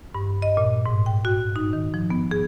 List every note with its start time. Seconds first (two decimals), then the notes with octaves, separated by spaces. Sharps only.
0.15 G2
0.42 D#5
0.57 A#2
0.86 G#2
1.06 G5
1.25 F#4
1.56 D#4
1.73 D#3
1.94 F3
2.10 B3
2.31 G#4